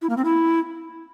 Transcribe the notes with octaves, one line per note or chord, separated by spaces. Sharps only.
E4
A#3
C4
E4